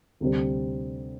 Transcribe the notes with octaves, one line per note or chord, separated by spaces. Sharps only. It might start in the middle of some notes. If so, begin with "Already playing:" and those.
D2 C3 G3 C4